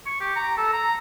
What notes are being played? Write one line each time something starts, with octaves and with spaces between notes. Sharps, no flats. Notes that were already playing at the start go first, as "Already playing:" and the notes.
C#6
G4
A#5
A4
A#5